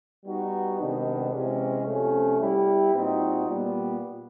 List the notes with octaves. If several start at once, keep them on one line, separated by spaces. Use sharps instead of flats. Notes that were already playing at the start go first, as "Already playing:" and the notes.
G3 B3 D#4 F#4
C3 D#3 G#3 B3 D4
C3 E3 G#3 C#4
C3 F3 A3 C#4
G3 B3 E4 G4
A#2 G3 C4 D#4 F#4
A#2 G3 B3